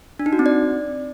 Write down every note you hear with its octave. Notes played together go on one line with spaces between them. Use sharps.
D4
D#4
F#4
C4
D5